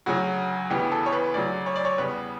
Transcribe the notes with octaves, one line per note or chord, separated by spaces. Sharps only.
D2 C#3 F#3 F#4
D2 C#3 E3 B3 G4
A4
C#5
B4
D2 C#3 F#3 D5
C#5
D5
C#5
E2 C#3 G3 B3 B4